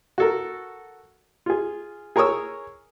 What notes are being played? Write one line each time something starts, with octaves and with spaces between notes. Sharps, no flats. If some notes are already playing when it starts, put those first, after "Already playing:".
F#4 A4 A#4
F4 G#4
G#4 A#4 C#5 C#6 D#6 E6